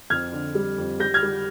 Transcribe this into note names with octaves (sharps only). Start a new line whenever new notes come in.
F2 F6 G#6
D3
G3
F2
G3 G6 A#6
F6 G#6
G3